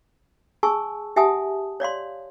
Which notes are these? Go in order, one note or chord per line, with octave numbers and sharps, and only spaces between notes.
G#4 G#5 A5 C#6 E6
G4 E5 F#5 G#5 A5 D#6
C#5 D5 F5 C6